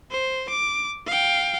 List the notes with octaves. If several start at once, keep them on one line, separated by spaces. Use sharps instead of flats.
C5
D6
F5 G5